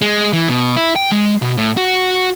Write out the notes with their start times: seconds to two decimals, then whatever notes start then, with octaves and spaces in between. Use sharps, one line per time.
0.02 G#3
0.33 E3
0.48 B2
0.77 E4
0.96 G5
1.11 G#3
1.42 B2
1.57 A2
1.77 F#4